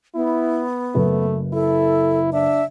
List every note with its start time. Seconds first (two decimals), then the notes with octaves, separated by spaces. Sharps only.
0.15 B3 E4
0.95 F#1 A3 B4
1.53 E4 A4
2.32 D4 E5